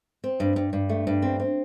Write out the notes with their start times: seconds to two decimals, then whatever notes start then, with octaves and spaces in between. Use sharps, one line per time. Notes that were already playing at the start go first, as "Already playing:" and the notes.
0.24 C4
0.40 G2
0.56 G2
0.73 G2
0.89 A3
1.07 G2
1.22 C4
1.40 C4